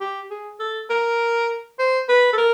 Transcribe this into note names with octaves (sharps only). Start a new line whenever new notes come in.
G4
G#4
A4
A#4
C5
B4
A4
A#4